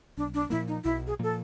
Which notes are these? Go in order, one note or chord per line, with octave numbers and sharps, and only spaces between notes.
B1 D4
D4
A#2 F3 A#3 E4
D#4
B1 E4
G#4
A#2 F3 A#3 A4